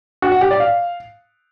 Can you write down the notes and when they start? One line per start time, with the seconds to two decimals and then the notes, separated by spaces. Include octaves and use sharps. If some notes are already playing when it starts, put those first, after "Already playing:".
0.22 F#4
0.32 F#5
0.41 G4
0.51 D5
0.60 F5